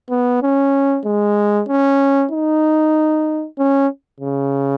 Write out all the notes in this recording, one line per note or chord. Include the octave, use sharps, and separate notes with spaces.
B3
C#4
G#3
C#4
D#4
C#4
C#3